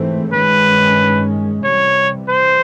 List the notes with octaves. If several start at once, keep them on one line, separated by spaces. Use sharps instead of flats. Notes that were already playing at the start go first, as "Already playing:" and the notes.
Already playing: G#2 E3 A3 C4
G2 D#3 G#3 C#4 B4
C3 E3 G3 C#5
C5